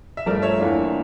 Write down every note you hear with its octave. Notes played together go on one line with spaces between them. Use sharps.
E5
G2 F3 A3 A#4 D5
C#5 E5
E2 E3 A#3 D4 F4